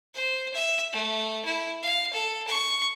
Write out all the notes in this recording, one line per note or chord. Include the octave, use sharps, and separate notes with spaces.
C5
E5
A3
E4
F5
A4
C#6